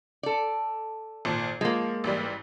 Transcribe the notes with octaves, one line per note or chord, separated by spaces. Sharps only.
A4 D5
G#1 A#2 A5
F3 G#3 A#3
A1 G#2 G3